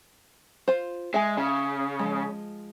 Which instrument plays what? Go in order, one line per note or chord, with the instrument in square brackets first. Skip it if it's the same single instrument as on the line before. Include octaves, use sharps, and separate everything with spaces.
[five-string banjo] F4 C5
[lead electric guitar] G#3 [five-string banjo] E5 G#5
[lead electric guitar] C#3
[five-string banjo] F3 G#3